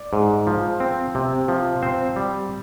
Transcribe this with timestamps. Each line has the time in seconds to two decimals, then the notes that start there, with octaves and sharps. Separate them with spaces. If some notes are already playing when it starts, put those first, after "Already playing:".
Already playing: D5
0.13 G#2
0.47 F3
0.80 C4
1.15 C3
1.48 F3
1.82 C4 C5
2.16 G3